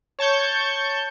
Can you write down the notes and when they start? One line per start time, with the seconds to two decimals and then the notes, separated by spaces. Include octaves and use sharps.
0.19 C#5 A5 C#6 G6